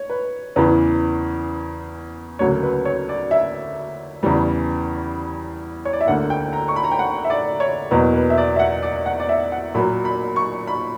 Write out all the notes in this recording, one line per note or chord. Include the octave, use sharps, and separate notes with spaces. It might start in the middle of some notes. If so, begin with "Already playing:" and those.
Already playing: C#5
B4
E2 C#3 E3 B4
D2 C#3 F#3 A#3 C#5
B4
C#5
D5
E5
E2 C#3 E3 G3
C#5
D5
E5
D2 D3 A#3 F#5
G5
A#5
C#6
B5
A#5
G5
F#5
E5
D5
C#5
E2 B2 F#3 A#3 B4
B4
E5
D5
E5
F#5
D5
F#5
D5
E5
F#5
A#2 F#3 A#3 B5
B5
C#6
B5